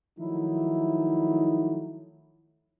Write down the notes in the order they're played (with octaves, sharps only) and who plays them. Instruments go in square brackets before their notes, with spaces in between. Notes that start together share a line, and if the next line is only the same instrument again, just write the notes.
[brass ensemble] D#3 F3 F#3 A3 D#4 E4